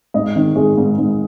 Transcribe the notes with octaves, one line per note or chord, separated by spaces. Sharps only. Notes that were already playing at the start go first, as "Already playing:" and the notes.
G#2 D#5
D#3
G#3
G#2
G#2